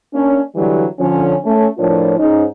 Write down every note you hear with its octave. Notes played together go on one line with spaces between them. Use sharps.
A#3 C#4 D4
D3 E3 F#3 G3
D3 F3 C#4
A3 C#4
A2 F3 D4 F4 A#4 C#5
G#2 C#4 D#4